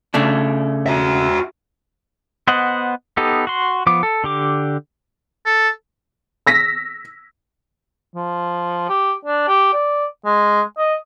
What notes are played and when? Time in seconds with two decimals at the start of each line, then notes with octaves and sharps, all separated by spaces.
0.14 C#3 A3 D4
0.86 F#4 E5
2.48 B3 C5 D#5 F#5
3.17 B3 D#4 G4 A4
3.47 F#4 C6
3.87 F3 B3 D6
4.03 A4
4.24 D3 G4 D6
5.46 A4
6.47 E6 A#6 B6
8.15 F3
8.89 G4
9.25 D4
9.48 G4
9.73 D5
10.25 G#3
10.78 D#5